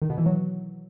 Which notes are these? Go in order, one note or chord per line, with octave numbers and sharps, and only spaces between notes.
D#3
B2
E3
F#3